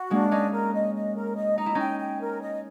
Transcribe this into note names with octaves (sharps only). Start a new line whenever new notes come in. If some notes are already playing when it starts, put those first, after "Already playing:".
Already playing: F#4
G#3 A#3 D4
C#4 D#4 D#5
A#4
D#5
D#5
A#4
D#5
D#4 A#5
E4
C#4 D#4 G5
G5
A#4
D#5